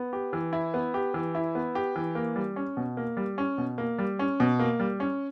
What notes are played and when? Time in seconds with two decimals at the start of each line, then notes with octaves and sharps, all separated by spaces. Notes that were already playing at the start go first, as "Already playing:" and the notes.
Already playing: B3
0.13 G4
0.33 E3
0.53 E4
0.74 B3
0.94 G4
1.14 E3
1.35 E4
1.55 B3
1.75 G4
1.96 E3
2.15 A#3
2.36 G3
2.56 C#4
2.77 B2
2.97 A#3
3.17 G3
3.38 C#4
3.58 B2
3.78 A#3
3.99 G3
4.19 C#4
4.40 B2
4.60 A#3
4.80 G3
5.00 C#4